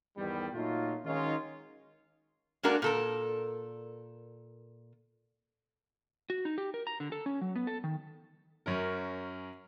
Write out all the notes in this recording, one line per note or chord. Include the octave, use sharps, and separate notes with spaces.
E2 G#2 D#3 G3
A#2 F#3 A3 D#4 F4
D#3 F#3 G#3 C#4 D#4 F4
G#3 A#3 D4 F#4 A#4 D5
A#2 A4 A#4
F#4
D#4
G4
A#4
A#5
D3
A4
C#4
F#3
B3
A4
D#3
F#2 C#4 A#4